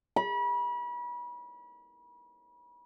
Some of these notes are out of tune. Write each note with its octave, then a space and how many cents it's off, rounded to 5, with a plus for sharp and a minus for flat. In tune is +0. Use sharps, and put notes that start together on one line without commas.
B5 -35